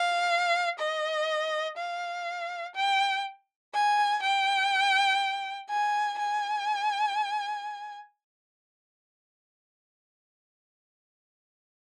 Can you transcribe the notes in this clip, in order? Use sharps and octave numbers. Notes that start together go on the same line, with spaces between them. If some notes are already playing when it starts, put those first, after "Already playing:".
Already playing: F5
D#5
F5
G5
G#5
G5
G#5
G#5